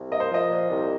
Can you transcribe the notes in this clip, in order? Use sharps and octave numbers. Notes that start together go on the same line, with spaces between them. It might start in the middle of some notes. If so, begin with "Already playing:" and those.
Already playing: C2
A#3 D#5
C5
F3 D#5
A#2
C2